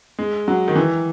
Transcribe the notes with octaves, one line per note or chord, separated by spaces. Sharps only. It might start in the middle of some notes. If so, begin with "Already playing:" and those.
G#3
F#3
D#3
E3